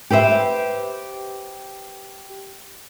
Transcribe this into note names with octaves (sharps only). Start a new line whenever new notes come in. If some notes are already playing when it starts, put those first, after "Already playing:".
G4 B4 C5 E5